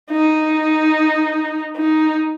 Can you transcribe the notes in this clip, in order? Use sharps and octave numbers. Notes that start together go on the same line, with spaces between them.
D#4
D#4